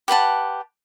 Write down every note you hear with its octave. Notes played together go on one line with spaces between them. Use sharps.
G4 B4 F#5 A5